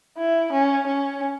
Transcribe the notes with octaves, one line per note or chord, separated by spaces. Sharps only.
E4
C#4
C#4